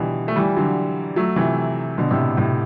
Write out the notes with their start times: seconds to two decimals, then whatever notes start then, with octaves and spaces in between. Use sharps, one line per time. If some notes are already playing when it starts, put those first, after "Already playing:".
Already playing: B2 D3 E3 G3
0.28 A3
0.36 E3 G3
0.57 D3 F#3
1.16 F#3 A3
1.36 C3 E3
1.98 B2 D3
2.10 A2 C3
2.37 A2 C3